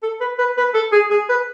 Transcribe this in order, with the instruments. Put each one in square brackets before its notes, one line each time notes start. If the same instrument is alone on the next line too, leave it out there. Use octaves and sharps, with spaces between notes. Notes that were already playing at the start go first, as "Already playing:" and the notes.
[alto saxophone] A4
B4
B4
B4
A4
G#4
G#4
B4